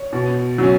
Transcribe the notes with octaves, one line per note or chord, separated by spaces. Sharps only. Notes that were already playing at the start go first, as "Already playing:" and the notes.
Already playing: C#5
B2
F#3 C#4